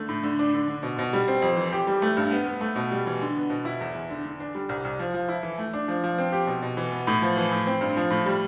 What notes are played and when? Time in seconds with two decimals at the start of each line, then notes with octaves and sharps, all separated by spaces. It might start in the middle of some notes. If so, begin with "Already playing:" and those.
Already playing: D3 A3
0.09 A2
0.23 D3
0.39 D4
0.54 D3
0.68 D3
0.83 B2
0.99 B2
1.13 G3
1.28 C4
1.42 F2
1.57 E3
1.72 G4
1.87 G3
2.02 A3
2.17 G2
2.31 B3
2.47 B3
2.61 A3
2.76 B2
2.92 G3
3.06 E3
3.21 D3
3.36 B3
3.50 B2
3.65 E4
3.81 E2
3.94 E2
4.10 D3
4.25 D3
4.40 D4
4.55 G3
4.69 C2
4.85 C2
4.99 F3
5.14 F3
5.29 E4
5.43 E3
5.58 A3
5.74 D4
5.88 F3
6.04 F3
6.18 C4
6.32 G4
6.47 B2
6.62 B2
6.77 E3
6.92 B3
7.07 A2
7.22 F3
7.37 E3
7.52 A2
7.67 C4
7.81 G2
7.97 F3
8.10 A2
8.26 G3